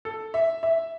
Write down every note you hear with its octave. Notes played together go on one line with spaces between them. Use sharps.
A4
E5
E5